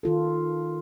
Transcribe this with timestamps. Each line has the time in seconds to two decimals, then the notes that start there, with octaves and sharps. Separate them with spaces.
0.03 D#3 F4 A4